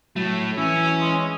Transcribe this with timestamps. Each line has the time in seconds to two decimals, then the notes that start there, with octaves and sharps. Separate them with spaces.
0.16 A2 F#3 A3
0.58 E3 C#4 E4
1.00 G#3